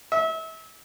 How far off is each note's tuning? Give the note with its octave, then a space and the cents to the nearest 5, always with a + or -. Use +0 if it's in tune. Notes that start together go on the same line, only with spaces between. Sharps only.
E5 -30